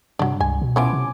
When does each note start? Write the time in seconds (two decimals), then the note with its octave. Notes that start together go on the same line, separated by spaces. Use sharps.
0.19 G2 C3 F#3 D4
0.41 C#2 G#5
0.62 B2
0.76 E3 F3 B3 C#4 G#5 D6
0.93 C3